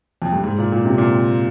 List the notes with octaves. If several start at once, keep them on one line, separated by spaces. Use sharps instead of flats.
F2
G2
G#2
A#2
A#2
C3
A#2